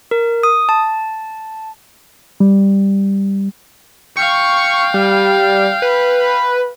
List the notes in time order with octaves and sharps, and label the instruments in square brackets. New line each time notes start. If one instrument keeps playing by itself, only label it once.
[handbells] A#4
D#6
A5
[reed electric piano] G3
[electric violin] F5 G5 [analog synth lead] C#6
[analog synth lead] G3
B4